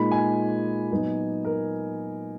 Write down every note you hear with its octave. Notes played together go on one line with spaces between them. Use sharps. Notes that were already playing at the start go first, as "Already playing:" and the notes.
Already playing: A#2 G#3 D#4 B5
G#5
A#2 F#3 B3 D#4
A#4